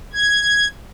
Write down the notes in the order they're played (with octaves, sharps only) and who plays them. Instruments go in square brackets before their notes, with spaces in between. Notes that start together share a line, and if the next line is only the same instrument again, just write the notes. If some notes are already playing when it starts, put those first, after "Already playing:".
[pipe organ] G#6